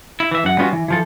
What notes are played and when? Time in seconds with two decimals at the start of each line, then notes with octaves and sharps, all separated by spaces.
0.20 E4
0.31 E3 E5
0.44 F#2 F#5
0.58 G3 B3 C#4 F4 F#4
0.73 E3
0.88 E3 F3 A4